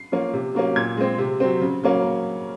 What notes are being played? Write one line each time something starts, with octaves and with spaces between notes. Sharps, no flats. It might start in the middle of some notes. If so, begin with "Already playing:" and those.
Already playing: C7
F3 A#3 C#4
C3
F#3 A#3 C#4
A#2 G#6
G#3 C4
C3
F#3 C4
C#3
F#3 A#3 C#4